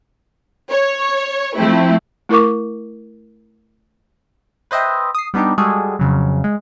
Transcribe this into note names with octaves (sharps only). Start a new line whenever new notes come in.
C#5
F3 A3 C4 E4
A3 E4 A#4 C#6 D6
B4 C5 D#5 E5 G5
D#6 C7
G3 B3 D4 D#4 G4
G3 G#3 F#4 G#4 A4
F2 C#3 F#3
G#3